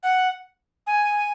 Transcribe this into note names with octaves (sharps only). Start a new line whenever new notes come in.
F#5
G#5